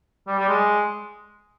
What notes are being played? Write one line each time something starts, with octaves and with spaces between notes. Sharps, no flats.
G3
G3
G#3